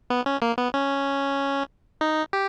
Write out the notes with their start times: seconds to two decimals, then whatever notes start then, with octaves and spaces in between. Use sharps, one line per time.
0.10 B3
0.26 C#4
0.42 A#3
0.58 B3
0.74 C#4
2.01 D#4
2.33 G4